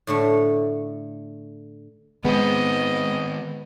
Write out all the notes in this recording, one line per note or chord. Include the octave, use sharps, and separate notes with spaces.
A2 D3 A3
D#3 G#3 B3 C4 C5 D#5